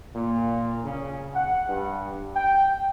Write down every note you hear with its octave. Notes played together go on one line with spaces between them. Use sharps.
A#2
C#3
F#5
G2
G5